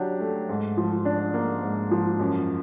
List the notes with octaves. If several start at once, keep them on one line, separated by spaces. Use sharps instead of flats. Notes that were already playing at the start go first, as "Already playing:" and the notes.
Already playing: F#3 D4 G4
A3
G#2
F3
D4
A#3
G#2
F3
F#2